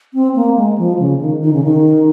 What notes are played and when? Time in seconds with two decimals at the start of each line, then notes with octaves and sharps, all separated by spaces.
0.14 C4
0.35 A#3
0.57 G#3
0.78 F3
0.99 C#3
1.21 D#3
1.42 D#3
1.53 C#3
1.64 D#3